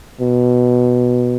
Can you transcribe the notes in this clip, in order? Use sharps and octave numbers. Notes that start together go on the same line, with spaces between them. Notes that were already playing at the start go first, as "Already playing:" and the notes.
B2